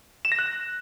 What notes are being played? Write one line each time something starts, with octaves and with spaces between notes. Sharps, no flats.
E7
A#6
F#6